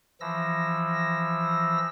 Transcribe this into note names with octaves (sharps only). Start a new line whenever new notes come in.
E3 F3 E6 A#6